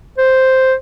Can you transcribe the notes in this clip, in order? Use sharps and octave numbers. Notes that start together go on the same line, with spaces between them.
C5